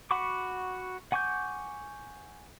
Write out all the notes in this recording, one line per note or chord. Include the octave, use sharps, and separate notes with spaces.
F#4 F#5 B5 C#6 D6
F#5 G#5 C#6 D6 G6